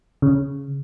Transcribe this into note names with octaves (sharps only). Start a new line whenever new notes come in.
C#3